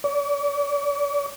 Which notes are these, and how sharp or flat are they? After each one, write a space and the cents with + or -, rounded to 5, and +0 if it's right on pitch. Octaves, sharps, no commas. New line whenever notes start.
D5 -45